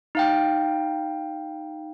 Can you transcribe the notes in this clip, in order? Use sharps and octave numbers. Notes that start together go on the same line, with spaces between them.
D#4 F5 G5